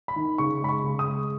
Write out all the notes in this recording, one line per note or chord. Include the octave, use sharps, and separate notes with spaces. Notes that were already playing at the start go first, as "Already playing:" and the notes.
B5
D#3
C#3 C#6
G#3 B5
C#6
C#3
D#6
G#3